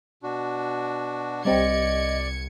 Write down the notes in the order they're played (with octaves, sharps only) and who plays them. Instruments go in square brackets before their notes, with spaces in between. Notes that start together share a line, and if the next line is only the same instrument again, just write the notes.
[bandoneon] B2 D4 F#4
[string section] C2 G#6 C#7 [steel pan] G3 C4 G4 [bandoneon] D5 [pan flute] D#5